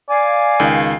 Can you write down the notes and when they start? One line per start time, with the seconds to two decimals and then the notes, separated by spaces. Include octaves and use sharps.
0.09 D5 F5 G#5
0.60 C#2 D#3